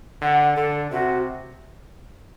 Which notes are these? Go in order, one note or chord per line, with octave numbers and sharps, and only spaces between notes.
D3 F#5
D3 A4
C3 F#4